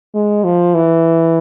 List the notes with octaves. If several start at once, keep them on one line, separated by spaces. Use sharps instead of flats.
G#3
F3
E3